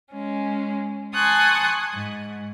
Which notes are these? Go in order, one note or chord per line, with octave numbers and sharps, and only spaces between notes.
G#3 C#4
G#5 A5 C6 C#6 D#6 F#6
G#2